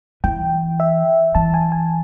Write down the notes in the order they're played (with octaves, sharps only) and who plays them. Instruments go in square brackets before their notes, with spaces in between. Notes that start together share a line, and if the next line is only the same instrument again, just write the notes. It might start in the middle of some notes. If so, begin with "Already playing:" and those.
[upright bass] E3 [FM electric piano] G5
[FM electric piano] E5
[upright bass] E3 [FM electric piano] A5
[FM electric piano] G#5
G#5